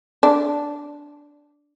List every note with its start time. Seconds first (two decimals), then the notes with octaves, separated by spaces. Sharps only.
0.23 D4